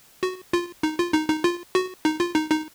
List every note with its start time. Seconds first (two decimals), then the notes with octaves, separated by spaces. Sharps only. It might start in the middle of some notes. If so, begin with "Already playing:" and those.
0.23 F#4
0.53 F4
0.83 D#4
0.98 F4
1.14 D#4
1.29 D#4
1.44 F4
1.75 F#4
2.05 D#4
2.20 F4
2.35 D#4
2.51 D#4